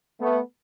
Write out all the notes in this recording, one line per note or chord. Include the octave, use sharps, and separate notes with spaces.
A3 B3